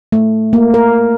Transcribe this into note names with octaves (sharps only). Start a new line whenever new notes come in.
A3
A#3
A#4